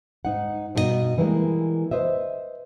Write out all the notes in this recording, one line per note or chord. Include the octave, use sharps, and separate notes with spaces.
G#2 D#4 F#5
G2 B2 D#4 G#4 D#5
E3 G3 G#3 A#3 E4
B4 C5 D#5 E5